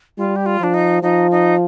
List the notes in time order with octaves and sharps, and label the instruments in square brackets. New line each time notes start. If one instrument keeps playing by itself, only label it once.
[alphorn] G3 [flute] F4
[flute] G4
F4
[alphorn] F3 [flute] D4
[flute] D#4
[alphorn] F3 [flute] D#4
[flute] D#4